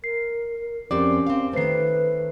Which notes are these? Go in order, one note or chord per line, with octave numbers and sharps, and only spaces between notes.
A#4 C7
F2 C4 C#4 G4 A#4 D5 D6
C4 F5
D#3 A3 B4 C5 C7